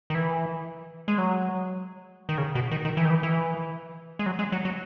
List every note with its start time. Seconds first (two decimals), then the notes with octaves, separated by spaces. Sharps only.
0.10 D#3
0.15 E3
1.08 G#3
1.18 F#3
2.29 D#3
2.38 C#3
2.55 B2
2.71 D#3
2.85 D#3
2.97 E3
3.05 D#3
3.10 E3
3.23 E3
4.19 G#3
4.26 F#3
4.39 G#3
4.52 F#3
4.65 F#3